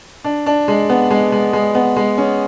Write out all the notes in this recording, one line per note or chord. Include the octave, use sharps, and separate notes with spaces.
D4
D4
G#3
B3
G#3
G#3
G#3
B3
G#3
C#4